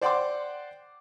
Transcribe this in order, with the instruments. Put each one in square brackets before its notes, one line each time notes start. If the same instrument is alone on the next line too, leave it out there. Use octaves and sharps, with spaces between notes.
[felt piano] C5 D5 F#5 G5 C6 D6